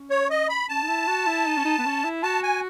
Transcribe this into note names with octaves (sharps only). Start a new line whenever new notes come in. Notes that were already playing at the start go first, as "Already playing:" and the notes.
Already playing: C#4
C#5
D#5
B5
C#4 A5
D#4
E4
F#4
E4
D#4
C#4
D#4
B3
C#4
E4
F#4 A5
G#5